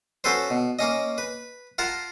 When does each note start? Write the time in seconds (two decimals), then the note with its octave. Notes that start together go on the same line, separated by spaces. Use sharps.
0.24 C#4 F#4 A4 B4 C5
0.50 B2
0.79 A#3 C#4 D#5
1.18 B4
1.78 F4 A#4 F#5 A5